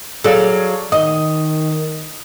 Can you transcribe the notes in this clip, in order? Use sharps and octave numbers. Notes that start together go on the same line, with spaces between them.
F#3 G#4 A4 D5 F5
D#3 D#5 D#6